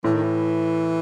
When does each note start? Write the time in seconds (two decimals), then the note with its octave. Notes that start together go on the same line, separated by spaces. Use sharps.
0.04 A2 E3
0.14 D#3
0.23 E3